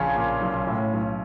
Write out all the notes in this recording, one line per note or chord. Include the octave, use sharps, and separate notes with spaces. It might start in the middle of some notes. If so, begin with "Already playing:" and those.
Already playing: A#1 C#3 C#4
A#2
B1
A2
B1